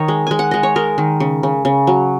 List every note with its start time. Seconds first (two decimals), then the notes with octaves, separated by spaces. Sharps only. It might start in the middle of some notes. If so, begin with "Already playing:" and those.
Already playing: D#3 C#5 D#5
0.08 G#3
0.27 G#3 G#5
0.39 F#5
0.51 G#3 D#5
0.63 C#5
0.76 G#3 A#4
0.98 D#3
1.20 C#3
1.43 C#3
1.65 C#3
1.87 F#3